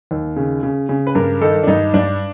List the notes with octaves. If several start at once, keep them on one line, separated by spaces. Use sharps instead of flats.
D#2
C#3
C#3
C#3
B4
G2 A#4
D#3 A4
D4
G2 D#4
G2 D4